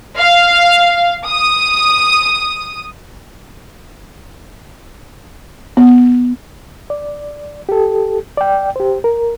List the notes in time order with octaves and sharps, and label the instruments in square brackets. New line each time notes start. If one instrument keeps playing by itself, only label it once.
[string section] F5
D#6
[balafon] B3
[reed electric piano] D5
G4 A4
D5 G5
G4 C5
A#4